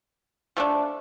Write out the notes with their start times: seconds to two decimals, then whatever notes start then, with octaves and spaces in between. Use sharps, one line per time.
0.57 F3 A3 D4